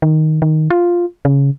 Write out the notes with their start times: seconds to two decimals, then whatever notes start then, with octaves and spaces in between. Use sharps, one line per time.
0.02 D#3
0.42 D#3
0.70 F4
1.25 C#3